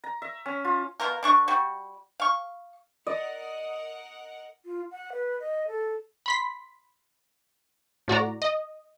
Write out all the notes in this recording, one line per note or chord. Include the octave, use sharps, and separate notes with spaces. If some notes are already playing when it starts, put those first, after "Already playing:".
A#5
E5
C#4
F4
B2 F4 A#4
D3 D4 C#6
G3 F#4
F5 C#6
A#4 D5 D#5 F#5
F4
F#5
B4
D#5
A4
B5 C6 B6
A2 F#4 D5 A#5
D#5